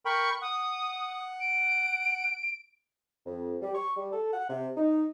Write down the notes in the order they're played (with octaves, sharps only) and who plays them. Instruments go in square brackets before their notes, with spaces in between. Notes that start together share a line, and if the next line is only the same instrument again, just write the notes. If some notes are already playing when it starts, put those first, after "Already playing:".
[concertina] A#4 G5 B5 [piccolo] C#6
[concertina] F#5 [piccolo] D#6
[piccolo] D7
[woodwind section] F2
G3
C#6
G3
A4
F#5
C3
D#4